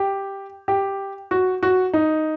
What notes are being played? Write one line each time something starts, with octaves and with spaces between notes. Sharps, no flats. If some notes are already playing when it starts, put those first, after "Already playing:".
Already playing: G4
G4
F#4
F#4
D#4